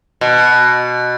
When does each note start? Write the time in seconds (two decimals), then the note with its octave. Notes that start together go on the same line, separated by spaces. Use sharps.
0.21 B2